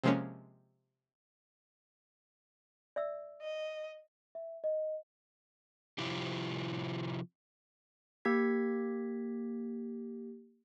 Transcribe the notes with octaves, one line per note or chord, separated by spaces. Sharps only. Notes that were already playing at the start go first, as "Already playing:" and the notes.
C3 F3 G#3 A#3 C#4
D5 E5 E6
D#5
E5
D#5
C3 F3 E4 F4 G4
A#3 G4 G#6 B6